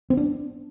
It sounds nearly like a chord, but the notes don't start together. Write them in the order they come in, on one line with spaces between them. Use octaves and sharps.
C4 B3 D4